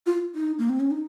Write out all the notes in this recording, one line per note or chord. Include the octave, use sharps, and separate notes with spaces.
F4
D#4
A#3
C4
C#4
D#4